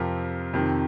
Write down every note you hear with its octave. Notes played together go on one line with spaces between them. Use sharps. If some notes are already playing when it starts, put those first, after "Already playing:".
Already playing: F2 C3 F3 G4 A#4
F2 C3 D#3